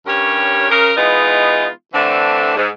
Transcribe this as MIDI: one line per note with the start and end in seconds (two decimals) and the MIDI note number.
0.07 0.70 43
0.07 0.70 61
0.07 0.70 67
0.07 0.70 70
0.07 0.70 73
0.70 0.92 49
0.70 0.92 70
0.97 1.68 52
0.97 1.68 56
0.97 1.68 59
0.97 1.68 63
0.97 1.68 65
1.94 2.53 50
1.94 2.53 52
1.94 2.53 57
1.94 2.53 60
1.94 2.53 62
2.57 2.69 44